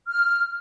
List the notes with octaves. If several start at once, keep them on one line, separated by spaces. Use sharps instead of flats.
F6